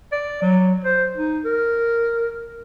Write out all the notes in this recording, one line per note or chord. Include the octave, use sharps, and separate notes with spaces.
D5
F#3
C5
D#4
A#4